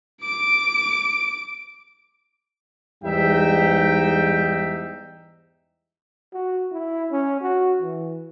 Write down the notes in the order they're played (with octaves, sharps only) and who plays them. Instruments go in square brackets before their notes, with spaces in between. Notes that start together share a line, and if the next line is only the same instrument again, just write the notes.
[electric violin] D6 D7
[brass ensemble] E2 G#2 G3 D#4 E5 G5
[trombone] F#4
E4
C#4
F#4
E3